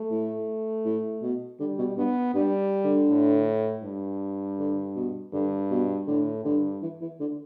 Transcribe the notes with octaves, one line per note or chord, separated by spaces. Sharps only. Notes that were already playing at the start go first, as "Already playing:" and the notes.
Already playing: A3
A2
A2
B2
D3 G3
B2
G2 B3
G2 G3
D3
A2
G2
D3
B2
G2 D3
B2
A2 D3
G2 D3
E3
E3
D3